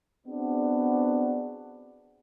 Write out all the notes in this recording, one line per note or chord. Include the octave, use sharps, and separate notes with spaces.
B3 C4 D4 F#4 G#4